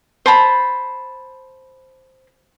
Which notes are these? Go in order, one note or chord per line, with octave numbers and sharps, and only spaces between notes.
C5 A5 B5